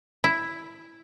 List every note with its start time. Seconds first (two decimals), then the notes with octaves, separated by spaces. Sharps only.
0.24 E4